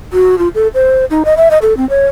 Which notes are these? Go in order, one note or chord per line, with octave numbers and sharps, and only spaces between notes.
F#4
F4
A4
C5
D#4
D#5
E5
D#5
A4
C4
C#5